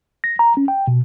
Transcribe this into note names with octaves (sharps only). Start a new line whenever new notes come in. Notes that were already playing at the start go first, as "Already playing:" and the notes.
A#6
A#5
C#4
G5
B2